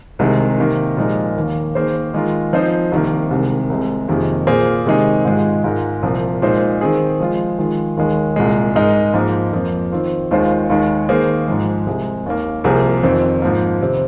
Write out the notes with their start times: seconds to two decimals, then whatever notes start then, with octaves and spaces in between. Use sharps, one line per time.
0.19 C2 C3 D#3 G#3
0.58 C3 D#3 A#3
0.97 A#2 F3 G#3 D#4 A#4
1.36 D#2 D#3 A#3
1.75 D#3 A#3 G#4 C5
2.14 D#3 G#3 F4 A#4
2.53 F3 C4 D#4 C5
2.92 C2 C3 D#3 A#3
3.31 C2 C3 D#3 G#3
3.70 C2 C3 G#3
4.09 F2 C3 D#3 A#3 G#4
4.47 A#2 A#3 G#4 C5
4.86 C3 D#3 G#3 D#4 G#4
5.25 G#2 D#3 G#3 F4
5.64 G#2 G#3 F4 A#4
6.02 C2 A#2 F3
6.42 A#2 G#3 D#4 C5
6.81 D#3 C4 G#4
7.20 F3 G#3 F4
7.59 D#3 G#3 F4
7.97 D#2 D#3 G#3
8.36 C2 A#2 G#3
8.75 G#2 G#3 D#4 A#4
9.14 G#2 F3 A#3
9.53 F2 F3 A#3
9.92 D#3 C4 F4
10.31 D#2 D#3 G#3 F4 C5
10.70 D#2 D#3 G#3
11.09 D#3 A#3 G#4 C5
11.48 G#2 F3 G#3
11.87 C2 C3 G#3
12.26 D#2 D#3 A#3
12.64 C2 C3 F3 A#3 G#4
13.03 F2 D#3 C4
13.42 G#2 F3 A#3
13.81 C3 D#3 C4